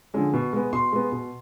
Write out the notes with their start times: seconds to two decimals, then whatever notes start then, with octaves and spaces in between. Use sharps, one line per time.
0.14 D3 F3 G#3 C#4
0.34 B2
0.53 G#3 B3
0.73 B2 C6
0.93 G#3 B3
1.12 B2